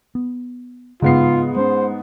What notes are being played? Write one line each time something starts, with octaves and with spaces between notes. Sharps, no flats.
B3
G#2 C#3 B3 F4 C7
G#3 C#4 C5